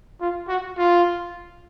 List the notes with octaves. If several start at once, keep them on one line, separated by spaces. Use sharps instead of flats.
F4
F#4
F4